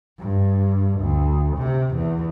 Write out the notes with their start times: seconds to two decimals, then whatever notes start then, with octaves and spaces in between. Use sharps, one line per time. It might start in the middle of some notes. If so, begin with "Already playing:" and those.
0.20 G2
1.01 D2
1.57 C3
1.96 E2